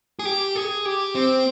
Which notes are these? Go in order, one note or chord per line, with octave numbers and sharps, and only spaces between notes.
G#4
G4
G#4
G4
C4